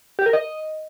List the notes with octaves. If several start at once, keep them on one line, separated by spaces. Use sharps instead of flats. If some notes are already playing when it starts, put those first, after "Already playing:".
G4
A#4
D#5